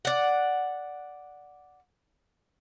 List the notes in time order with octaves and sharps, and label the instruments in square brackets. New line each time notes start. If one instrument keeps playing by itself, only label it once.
[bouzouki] D5 F#5